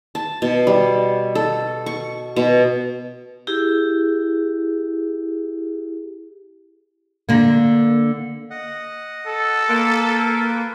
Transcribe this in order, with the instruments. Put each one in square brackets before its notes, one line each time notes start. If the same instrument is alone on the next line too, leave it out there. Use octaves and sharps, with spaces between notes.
[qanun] A5
B2
G3
A4
C#6
B2
[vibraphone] E4 G4 G#4
[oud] D3 A#3
[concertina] D#5 F#5
[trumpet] A4
[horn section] A#3 [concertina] F4 B4